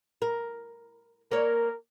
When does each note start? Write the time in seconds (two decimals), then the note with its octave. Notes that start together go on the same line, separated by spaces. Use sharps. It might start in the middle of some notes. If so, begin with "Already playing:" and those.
0.22 A#4
1.31 A#3 A#4 C#5